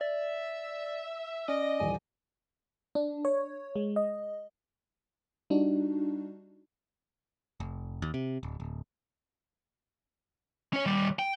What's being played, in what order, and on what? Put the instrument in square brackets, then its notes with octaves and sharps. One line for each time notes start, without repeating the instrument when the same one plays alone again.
[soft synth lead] D5 [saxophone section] E5
[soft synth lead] C#4 [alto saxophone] D5 [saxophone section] D#5
[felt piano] D#1 E3 [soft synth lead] G#5
[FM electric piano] D4
C#5
G#3
D#5
G3 D4 D#4 F#4
[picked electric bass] F1
D#2
C3
D1
D1
[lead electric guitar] C#4 C#5
D#2 G3
G5